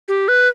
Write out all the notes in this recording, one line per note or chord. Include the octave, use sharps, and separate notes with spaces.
G4
B4